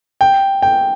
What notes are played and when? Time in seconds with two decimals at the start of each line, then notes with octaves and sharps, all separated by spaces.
0.21 G5
0.62 G5